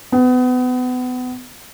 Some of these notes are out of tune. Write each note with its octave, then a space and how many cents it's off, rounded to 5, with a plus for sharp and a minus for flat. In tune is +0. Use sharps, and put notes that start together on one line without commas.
B3 +30